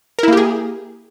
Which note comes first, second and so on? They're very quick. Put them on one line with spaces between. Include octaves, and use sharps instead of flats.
A#4 E4 A#3 G4 G#4